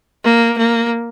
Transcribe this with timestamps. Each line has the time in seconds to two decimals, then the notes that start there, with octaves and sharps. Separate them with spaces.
0.24 A#3
0.58 A#3